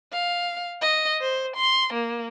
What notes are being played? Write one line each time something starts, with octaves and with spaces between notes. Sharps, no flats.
F5
D#5
C5
C6
A#3